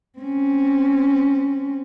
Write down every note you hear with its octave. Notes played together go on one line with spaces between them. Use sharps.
C4 C#4